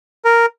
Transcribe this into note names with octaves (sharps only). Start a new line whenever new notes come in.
A#4